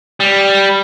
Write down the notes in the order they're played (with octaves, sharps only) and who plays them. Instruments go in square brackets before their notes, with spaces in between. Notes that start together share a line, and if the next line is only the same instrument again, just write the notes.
[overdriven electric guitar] G3